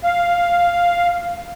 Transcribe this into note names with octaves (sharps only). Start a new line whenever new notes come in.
F5